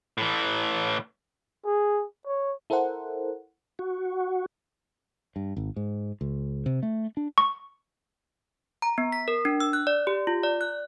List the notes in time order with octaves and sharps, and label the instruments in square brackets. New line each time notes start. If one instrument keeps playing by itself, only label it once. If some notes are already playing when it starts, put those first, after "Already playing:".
[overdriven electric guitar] A2 E3
[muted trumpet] G#4
C#5
[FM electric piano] E4 A4 A#4 C5 F#5
[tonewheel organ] F#4
[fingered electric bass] G2
G#1
G#2
C#2
C3
A3
D4
[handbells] C#6
A#5
B3
B6
A#4
D4
E6
F#6
D5
G4
F4
D5
F#6